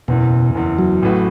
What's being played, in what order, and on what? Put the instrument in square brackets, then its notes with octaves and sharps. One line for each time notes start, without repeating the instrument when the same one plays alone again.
[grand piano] F#1 E2 E3 [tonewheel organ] B2
[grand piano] F#1 E2 E3
[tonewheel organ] F#3
[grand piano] A1 A2 A3 F#4 B4